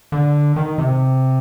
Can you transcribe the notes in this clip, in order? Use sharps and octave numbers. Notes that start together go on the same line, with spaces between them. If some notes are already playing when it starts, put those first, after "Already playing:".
D3
D#3
C3